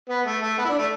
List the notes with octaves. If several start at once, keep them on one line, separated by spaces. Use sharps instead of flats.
B3
A3
A3
B3
E4
D4
A3